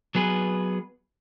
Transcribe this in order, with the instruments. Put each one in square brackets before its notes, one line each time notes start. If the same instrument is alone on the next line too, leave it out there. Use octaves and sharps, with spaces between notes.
[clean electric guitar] F#3 B3 G#4 B4